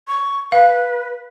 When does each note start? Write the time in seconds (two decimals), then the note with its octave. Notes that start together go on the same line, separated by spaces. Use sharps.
0.08 C#6
0.52 B4 F5